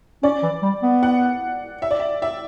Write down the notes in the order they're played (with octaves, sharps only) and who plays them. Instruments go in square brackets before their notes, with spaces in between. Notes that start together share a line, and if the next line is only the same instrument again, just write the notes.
[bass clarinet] C#4 [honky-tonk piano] D5
[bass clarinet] E3
G3
B3
[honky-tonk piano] F#5
E5
D5
E5
E5